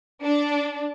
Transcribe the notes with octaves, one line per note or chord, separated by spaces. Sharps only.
D4